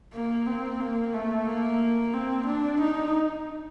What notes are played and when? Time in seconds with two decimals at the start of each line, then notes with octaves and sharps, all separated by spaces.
0.13 A#3
0.46 C4
0.80 A#3
1.14 A3
1.47 A#3
2.14 C4
2.46 D4
2.80 D#4